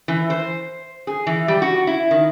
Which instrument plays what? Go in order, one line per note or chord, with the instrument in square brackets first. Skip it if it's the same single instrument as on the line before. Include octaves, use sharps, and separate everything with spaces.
[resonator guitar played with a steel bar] E3
C5
G#4
E3
G3
F#4
E4
D#3